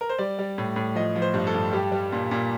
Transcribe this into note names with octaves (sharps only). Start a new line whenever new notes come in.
A#4
C5
G3 D5
G3
A2
A2
F3 D#5
F3
C5
G2
A4
G2
G3 G4
G3
A#2
A#2